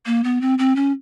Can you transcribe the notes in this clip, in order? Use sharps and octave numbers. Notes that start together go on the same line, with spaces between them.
A#3
B3
C4
C4
C#4